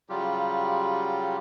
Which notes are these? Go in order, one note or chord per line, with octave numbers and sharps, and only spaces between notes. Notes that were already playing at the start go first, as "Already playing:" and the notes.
C#3 F#3 G3 F4 G4